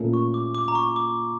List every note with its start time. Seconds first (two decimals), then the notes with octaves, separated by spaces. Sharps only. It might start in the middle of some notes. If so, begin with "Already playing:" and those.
Already playing: A#2 A3 C#4 F4 A#4
0.13 C#6
0.34 D6
0.55 D6
0.68 A#5
0.75 C#6
0.96 D6